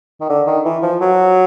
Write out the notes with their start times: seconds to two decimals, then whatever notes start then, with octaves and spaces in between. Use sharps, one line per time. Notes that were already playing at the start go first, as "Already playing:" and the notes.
0.21 D#3
0.29 D3
0.47 D#3
0.64 E3
0.82 F3
1.01 F#3